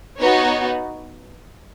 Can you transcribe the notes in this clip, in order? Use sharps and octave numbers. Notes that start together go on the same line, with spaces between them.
B3 D#4 F#4 C#5